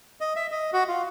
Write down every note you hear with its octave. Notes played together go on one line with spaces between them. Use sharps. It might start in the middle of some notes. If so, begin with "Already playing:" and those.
D#5
E5
D#5
F#4
F4